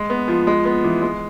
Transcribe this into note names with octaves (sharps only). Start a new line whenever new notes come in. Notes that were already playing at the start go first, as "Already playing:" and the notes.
Already playing: G#3
B3
F3
G#3
B3
E3
G#3